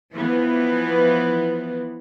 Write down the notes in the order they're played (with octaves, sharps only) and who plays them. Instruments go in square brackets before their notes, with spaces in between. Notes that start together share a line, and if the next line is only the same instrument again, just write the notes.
[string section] E3 F3 B3